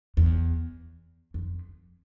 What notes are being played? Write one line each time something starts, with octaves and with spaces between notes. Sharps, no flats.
E2
F2